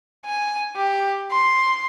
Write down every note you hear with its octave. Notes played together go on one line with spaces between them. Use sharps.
G#5
G4
C6